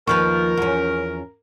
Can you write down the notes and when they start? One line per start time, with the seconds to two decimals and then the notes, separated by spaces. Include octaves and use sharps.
0.07 D#2 F3 A#4 B4 C#6 F6 G6
0.57 E2 C#4